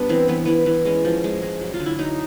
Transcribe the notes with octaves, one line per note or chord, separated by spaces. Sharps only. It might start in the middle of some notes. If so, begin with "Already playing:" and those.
Already playing: G3 B3 D4
E3 C4
E3 B3
E3 B3
E3
G#3 C#4
F3
G#3
G#3
F#3
F4
D3
E4
F#3 D#4